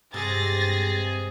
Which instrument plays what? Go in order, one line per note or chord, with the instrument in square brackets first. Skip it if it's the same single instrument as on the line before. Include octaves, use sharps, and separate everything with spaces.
[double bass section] G2 G#3 [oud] C3 [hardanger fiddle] G#4 [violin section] A6 A#6